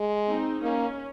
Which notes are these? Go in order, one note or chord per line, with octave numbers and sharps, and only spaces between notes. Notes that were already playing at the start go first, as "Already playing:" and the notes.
Already playing: G#3
C4 D#4
A#3 C#4